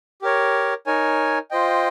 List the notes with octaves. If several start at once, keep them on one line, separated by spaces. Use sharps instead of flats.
G4 A#4 C#5
D#4 A#4 C#5 G#5
F4 C5 D#5 G5